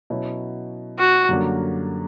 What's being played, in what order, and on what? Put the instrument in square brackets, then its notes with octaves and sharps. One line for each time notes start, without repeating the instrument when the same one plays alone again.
[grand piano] B2 F#3 C#4 E4
[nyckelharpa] F#4
[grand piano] F#2 D3 G3 A#3 D4